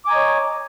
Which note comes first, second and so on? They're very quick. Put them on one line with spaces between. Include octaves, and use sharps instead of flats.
D6 G#5 A#5 D#5 C#5